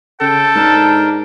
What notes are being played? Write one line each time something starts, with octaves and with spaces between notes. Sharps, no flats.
C#3 A4 G5
G#2 D4 A#4 A5